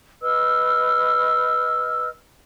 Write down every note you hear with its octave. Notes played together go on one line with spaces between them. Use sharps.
B4 D#5 E6 F6